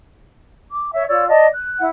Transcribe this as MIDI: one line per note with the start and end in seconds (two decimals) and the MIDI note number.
0.70 0.90 86
0.92 1.04 73
0.92 1.04 76
1.08 1.27 65
1.08 1.27 73
1.08 1.27 74
1.08 1.27 88
1.28 1.46 74
1.28 1.46 75
1.28 1.46 81
1.53 1.78 90
1.78 1.88 64
1.78 1.88 78